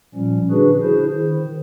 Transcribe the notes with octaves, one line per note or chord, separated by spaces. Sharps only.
A#2 F3 G3 C#4
D3 D4 F#4 G#4 B4
E4 G#4 C5
D#3